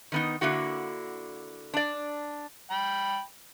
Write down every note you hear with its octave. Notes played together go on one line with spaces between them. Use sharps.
D#3 B3 D#4
D3 A#3 E4 F#4 F#5
D4 D5
G5 B5